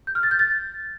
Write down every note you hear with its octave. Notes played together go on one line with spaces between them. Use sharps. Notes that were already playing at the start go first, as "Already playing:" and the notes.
G6
F6
A6
G6
A6